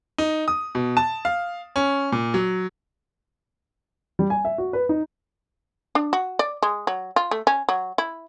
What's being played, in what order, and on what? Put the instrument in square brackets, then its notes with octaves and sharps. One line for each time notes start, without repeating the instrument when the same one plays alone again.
[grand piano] D#4
D#6
B2
A5
F5
C#4
A#2
F#3
G3
G#5
E5
F#4
B4
D#4
[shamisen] D4
F#4
D5
G#3
F#3
F4
A3
C#4
F#3
E4